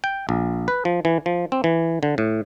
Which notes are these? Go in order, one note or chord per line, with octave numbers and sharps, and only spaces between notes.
G5
A#1
B4
F3
E3
F3
C4
E3
D3
A2